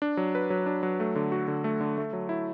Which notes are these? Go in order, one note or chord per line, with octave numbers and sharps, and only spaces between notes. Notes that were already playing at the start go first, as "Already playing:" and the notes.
D4
F#3
B4
F#3
D4
F#3
A3
D3
F#4
D3
A3
D3
A3
F#3
E4